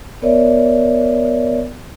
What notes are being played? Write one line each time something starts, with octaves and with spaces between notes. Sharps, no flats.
B3 A#4 C#5 D5 E5